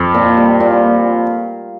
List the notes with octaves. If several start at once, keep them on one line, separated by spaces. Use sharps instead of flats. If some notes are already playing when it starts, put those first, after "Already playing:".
Already playing: F2
A#2
G3
A#2